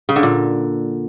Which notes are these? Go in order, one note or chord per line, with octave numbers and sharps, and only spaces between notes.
C#3
D3
A#2